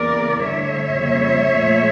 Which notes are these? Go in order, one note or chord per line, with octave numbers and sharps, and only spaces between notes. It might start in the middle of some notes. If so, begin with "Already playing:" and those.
Already playing: E2 C#3 E3 A#3 A#4 D5
G2 D3 A3 C#5 E5
F2 C#3 G3 A#3
A#2 F3 A3